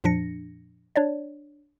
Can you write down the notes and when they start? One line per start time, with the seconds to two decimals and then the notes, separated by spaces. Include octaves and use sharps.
0.04 F2 A#2 F3 D4 A#6 C#7
0.96 D4 C#5 D5